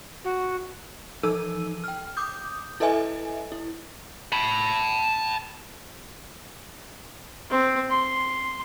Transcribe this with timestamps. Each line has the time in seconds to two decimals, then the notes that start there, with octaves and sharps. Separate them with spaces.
0.24 F#4
1.23 E3 F3 D#4 A4 E6 D#7
1.84 G5 F6
2.17 D6 D#6 G6
2.80 E4 A4 B4 D#5 E5 G#5
3.52 E4
4.33 A5 B5
7.50 C4
7.90 C6